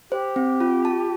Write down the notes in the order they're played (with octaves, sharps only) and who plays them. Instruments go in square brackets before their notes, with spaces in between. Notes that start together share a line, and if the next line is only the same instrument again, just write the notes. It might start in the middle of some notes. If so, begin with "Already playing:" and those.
[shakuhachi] G4 [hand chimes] C5
[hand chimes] C4
F4
A5